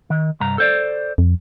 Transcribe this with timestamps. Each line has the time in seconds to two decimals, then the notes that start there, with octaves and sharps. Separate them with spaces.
0.10 D#3
0.40 C2 G2 A#5
0.58 A4 C5 D5
1.18 F2